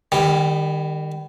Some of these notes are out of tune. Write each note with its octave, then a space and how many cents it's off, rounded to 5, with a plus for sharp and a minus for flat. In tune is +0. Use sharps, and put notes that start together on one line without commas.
D#3 -25 G3 +20